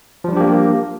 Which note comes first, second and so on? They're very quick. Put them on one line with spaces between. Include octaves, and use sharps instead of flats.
F3 G3 D4 G4 A#3